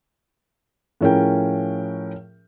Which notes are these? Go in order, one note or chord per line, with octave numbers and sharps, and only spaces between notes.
A2 F3 C#4 G#4 A#4 G5